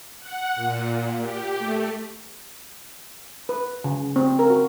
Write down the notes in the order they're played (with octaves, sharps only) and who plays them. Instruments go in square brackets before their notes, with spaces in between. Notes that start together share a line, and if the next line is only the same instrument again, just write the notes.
[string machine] F#5
A#2
G4
A3
[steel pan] B4
C#3
C4
A#4
F#4